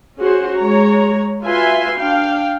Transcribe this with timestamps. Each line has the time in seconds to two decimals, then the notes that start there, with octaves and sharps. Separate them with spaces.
0.19 C#4 F#4 G#4 C5
0.56 G#3 C#5 A#5
1.43 F4 F#4 B4 E5 G#5 C6
1.99 D4 F5 G5